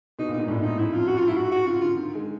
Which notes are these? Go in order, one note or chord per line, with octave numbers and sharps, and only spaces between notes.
B2 D#4
A#2
G#2 D#4
A2 D4
G#2 D#4
F#2 E4
F2 F4
F#2 F#4
F4
G#2
E4
F#4
F#4
C#3 F4
D3 F4
D#3
D3
G#3